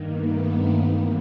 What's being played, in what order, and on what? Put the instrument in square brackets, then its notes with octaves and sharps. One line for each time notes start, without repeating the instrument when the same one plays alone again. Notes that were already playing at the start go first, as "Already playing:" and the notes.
Already playing: [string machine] G2 D#3 A#3
A3 B3
A#3 C4
G2 E3 A#3